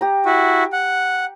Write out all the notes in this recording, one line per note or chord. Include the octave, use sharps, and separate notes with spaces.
G4 A#5
E4 F#4
F#5